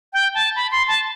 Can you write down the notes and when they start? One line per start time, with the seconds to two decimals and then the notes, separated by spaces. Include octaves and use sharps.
0.13 G5
0.35 A5
0.56 B5
0.72 C6
0.88 A5